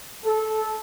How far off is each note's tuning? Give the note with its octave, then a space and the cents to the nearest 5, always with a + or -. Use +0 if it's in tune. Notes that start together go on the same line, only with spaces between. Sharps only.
A4 -15